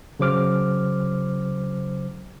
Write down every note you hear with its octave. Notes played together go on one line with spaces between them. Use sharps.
C#3 F#3 C5 D6 F6